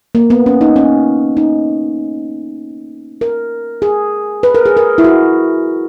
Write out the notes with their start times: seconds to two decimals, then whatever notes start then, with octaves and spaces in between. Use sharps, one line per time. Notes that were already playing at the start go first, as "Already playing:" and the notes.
0.15 A#3
0.30 B3
0.46 C#4
0.61 D#4
0.76 C#4
1.37 D#4
3.21 A#4
3.82 G#4
4.43 B4
4.55 A#4
4.66 G#4
4.77 A#4
4.98 E4
5.04 F#4